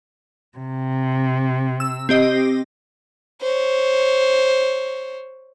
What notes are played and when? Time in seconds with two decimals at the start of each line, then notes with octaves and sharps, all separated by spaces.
0.58 C3
1.80 E6
2.09 C4 G4 D#5
3.41 C5 C#5